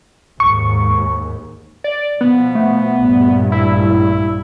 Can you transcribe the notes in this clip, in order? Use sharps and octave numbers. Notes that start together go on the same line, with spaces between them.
D#2 G#2 C#6
D5
B2 F3 B3
A3
A#1 G2
E4